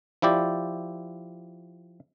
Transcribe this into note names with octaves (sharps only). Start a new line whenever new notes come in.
F3 E4 G4 D5